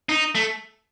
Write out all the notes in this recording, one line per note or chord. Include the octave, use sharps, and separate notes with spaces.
D#4
A3